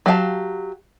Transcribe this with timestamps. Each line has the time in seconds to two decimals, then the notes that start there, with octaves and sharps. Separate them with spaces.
0.06 F#3 G4 F5 A5